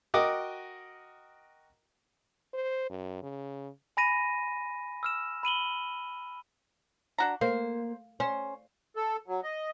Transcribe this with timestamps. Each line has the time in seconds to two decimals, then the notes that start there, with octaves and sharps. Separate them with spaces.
0.14 F#4 A#4 D#5 G5 D6 D#6
2.54 C5
2.90 F#2
3.22 C#3
3.97 G#5 B5 A#6 D#7
5.03 E6 F6 E7
5.43 B5 D#7 F#7 G7
7.18 D4 F#4 A#5
7.41 A#3 C5
8.20 C#4 C5
8.96 A4
9.28 F#3
9.43 D#5